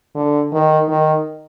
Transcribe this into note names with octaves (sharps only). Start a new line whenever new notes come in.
D3
D#3
D#3